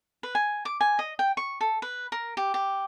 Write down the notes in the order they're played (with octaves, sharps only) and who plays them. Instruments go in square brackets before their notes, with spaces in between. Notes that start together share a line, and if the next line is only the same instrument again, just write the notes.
[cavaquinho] B4
G#5
D6
G#5
D#5
G5
C#6
A4
B4
A#4
G4
G4